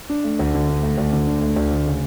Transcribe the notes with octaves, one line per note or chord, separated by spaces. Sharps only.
D4
A3
D2
D3
D4
A3
D2
D3
D4
A3
D2
D3
C#3